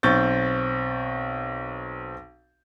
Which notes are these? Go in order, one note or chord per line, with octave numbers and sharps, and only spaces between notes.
B1 C4 C#6 G6 A6